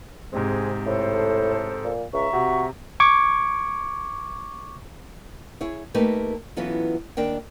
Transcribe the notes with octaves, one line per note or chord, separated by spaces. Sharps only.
G#2 C3 G#3 C4 G#4
A2 A4 C5
A#2
C#2 E5 A#5 C#6
C3 F#4
C#6 D6 G#6
E4 G#4 C#5
A3 A#3 D#4 G4 A#4 B4
E3 F#3 B3 C#4 F4 A4
D#2 D4 A#4 G5